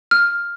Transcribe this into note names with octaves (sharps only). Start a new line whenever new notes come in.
F6